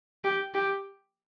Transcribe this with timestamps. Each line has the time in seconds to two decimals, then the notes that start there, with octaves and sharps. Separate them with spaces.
0.24 G4
0.54 G4